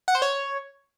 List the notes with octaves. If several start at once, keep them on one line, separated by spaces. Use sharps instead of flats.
F#5
C5
C#5